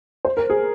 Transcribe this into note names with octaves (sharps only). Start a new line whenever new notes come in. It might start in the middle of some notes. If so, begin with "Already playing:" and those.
C5
A#4
G#4